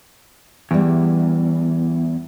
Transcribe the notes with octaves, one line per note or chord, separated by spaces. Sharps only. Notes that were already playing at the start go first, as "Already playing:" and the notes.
E2 E3 G3